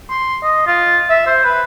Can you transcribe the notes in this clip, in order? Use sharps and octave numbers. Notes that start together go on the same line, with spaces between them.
C6
D#5
F4
E5
C5
B4